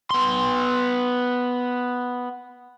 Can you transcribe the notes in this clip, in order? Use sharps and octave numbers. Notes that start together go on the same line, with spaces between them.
B3 C6